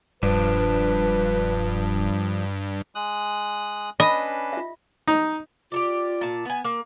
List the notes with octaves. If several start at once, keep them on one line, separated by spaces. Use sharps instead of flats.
E1 G2 F3 D4 B4
G#3 D#6 F#6
C#4 D4 B4 D#5 B5
F4 E5
D#4
F4 G4 A4 D5
A#2 A5
B3 G#5
A#3